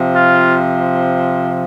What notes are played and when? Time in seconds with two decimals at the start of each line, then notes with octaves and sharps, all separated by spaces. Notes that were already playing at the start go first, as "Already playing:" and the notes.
Already playing: C3 F3
0.14 F4